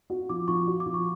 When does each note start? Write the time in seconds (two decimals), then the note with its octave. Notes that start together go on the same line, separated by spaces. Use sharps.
0.10 F#4
0.29 F3 D6
0.48 F3 C#6
0.67 F#4
0.80 D6
0.86 F3
0.94 C#6